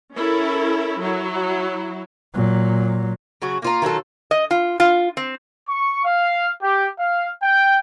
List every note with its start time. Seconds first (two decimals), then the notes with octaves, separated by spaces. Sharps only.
0.14 C#4 E4 A4 A#4
0.99 F#3 E4
2.34 A#2 F#3
3.42 C#3 F#3 F#4
3.62 A#3 F4 A#5
3.82 D#3 F#3 F4 A4
4.31 D#5
4.51 F4
4.80 F4
5.17 C4
5.68 C#6
6.05 F5
6.63 G4
6.99 F5
7.43 G5